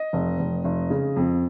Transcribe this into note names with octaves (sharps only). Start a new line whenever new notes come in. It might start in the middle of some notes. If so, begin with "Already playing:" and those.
Already playing: D#5
F1
F1
F1
C#3
F2